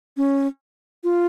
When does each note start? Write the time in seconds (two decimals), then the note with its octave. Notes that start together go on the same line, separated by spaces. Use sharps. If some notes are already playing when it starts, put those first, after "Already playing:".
0.17 C#4
1.04 F4